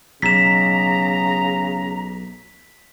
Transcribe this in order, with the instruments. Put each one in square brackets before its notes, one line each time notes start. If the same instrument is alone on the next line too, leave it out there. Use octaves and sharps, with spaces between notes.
[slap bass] B1 [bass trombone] C#3 [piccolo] A#5 [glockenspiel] B6 E7